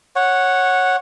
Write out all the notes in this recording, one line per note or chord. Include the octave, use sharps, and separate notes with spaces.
C#5 F#5